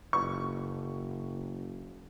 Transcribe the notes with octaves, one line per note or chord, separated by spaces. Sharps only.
F#1 C#6